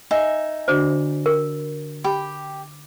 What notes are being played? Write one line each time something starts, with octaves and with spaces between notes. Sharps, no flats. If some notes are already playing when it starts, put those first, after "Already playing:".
D#4 E5 G#5
D3 D4 F#4 C5
A#4
G4 B5